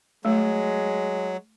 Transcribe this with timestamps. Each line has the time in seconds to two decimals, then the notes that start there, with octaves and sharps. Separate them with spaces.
0.25 F#3 G#3 A3